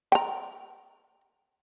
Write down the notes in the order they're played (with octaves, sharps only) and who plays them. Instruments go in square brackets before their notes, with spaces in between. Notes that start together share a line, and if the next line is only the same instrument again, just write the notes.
[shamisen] G5 A#5